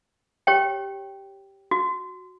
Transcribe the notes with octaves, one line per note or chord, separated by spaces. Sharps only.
G4 C#5 G5
F#4